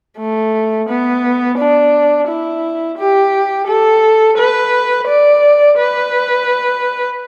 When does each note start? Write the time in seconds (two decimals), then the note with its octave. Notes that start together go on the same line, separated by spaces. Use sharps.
0.18 A3
0.89 B3
1.57 D4
2.28 E4
2.98 G4
3.67 A4
4.38 B4
5.08 D5
5.78 B4